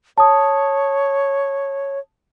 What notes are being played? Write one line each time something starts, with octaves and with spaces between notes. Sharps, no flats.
C#5 A5 D#6